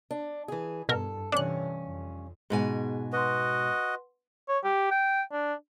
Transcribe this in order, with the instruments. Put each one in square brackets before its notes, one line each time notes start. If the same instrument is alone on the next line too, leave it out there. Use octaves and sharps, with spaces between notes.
[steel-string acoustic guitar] D4
E3 G#4
[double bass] G2 [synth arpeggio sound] B2 A#4 [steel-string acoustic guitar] A4
[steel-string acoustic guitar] G2 C#4 [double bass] C3 E3 [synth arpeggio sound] D4 F#6
[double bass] F2
[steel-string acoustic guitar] G#2 B2 G#5 [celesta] G#4
[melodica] F#4 D#5 [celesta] B4 F#5 C6
[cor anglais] C#5
G4
G5
D4